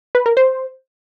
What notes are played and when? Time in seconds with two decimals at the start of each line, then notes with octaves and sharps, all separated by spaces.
0.15 B4
0.26 A#4
0.37 C5